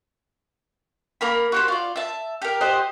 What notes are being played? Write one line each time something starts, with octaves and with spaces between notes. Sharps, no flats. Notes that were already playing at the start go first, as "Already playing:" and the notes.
A#3 A#4 B5
F#4 G4 C5
F4 D5
E5 A5
G4 A#4
G4 C5 D#5 F#5